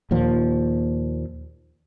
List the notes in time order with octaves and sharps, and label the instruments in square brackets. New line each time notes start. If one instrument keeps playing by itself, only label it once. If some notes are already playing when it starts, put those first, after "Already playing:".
[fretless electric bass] D#2 A#2 F3